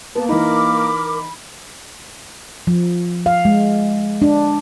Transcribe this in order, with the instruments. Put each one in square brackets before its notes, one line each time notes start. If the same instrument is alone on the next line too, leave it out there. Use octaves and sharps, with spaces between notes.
[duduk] A#3 [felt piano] B3 [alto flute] A5
[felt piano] E3 D#4 [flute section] A#4 D6 [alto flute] B5
[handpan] F3
F5
G#3
D4